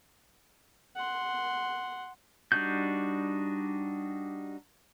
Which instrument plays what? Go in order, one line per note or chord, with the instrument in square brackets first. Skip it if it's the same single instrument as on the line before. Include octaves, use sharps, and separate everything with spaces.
[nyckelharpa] F#5 C6
[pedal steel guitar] G3 D4 D#4 F#4 G6